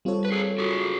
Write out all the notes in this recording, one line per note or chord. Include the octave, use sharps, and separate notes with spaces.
G3 C4 F4 A4 C#5
B4
G#4 A#4
F#4 G#4